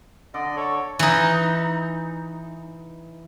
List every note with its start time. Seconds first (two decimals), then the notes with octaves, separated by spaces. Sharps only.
0.34 D3 D5 D#5
0.56 A4 C#5
0.99 E3 D#4